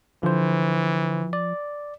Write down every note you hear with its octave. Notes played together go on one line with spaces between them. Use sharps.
D3 E3 F3 C5
D5